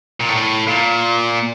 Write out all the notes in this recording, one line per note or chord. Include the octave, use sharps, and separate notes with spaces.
A#2
A2
A#2